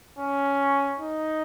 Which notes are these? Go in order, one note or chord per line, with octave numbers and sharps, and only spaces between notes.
C#4
D#4